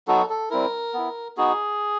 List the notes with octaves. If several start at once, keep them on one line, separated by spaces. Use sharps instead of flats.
F#3 B3 D#4 F#4 A4
A4
G3 C4 E4 A#4
B3 E4
B3 D#4 F#4 G#4